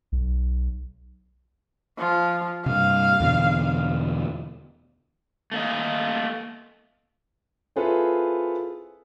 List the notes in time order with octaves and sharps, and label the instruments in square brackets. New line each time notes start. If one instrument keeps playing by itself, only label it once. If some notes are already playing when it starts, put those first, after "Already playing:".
[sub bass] B1
[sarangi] F3
[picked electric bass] G2 C3 [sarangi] F5
[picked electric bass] E2 B2 D3
[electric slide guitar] A3 A#3 D#5
[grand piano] C4 E4 F4 G#4 A4 B4